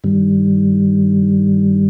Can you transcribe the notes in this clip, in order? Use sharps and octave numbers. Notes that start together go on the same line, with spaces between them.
G2 D#3 G3